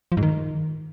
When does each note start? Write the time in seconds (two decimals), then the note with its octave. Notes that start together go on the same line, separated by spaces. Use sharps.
0.12 F3
0.17 G#2
0.23 D#3